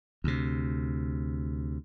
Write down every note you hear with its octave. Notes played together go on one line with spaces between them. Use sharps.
D2 C3